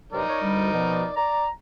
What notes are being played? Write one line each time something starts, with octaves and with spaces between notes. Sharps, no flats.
G2 C3 F#3 D#4 A#4 D5
C#5
D2 G3
B2 F3
D5 A#5